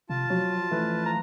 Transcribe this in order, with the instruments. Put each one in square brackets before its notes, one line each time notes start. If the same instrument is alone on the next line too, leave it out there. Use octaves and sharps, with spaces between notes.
[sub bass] C3 [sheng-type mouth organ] F4 A5
[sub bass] F3 [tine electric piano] F#3
[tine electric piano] E3 A3 [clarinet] B4
[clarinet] A#5